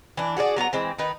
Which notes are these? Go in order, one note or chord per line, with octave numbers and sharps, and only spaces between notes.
E3 D4
F#4 G#4 A#4 D5
F#3 B3 D5 A#5
E3 G#3 C4
D#3 D#4 B4